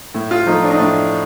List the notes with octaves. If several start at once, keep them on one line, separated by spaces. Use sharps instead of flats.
A2
F4
F3 A3 D#4
D4
D#4
A2 D4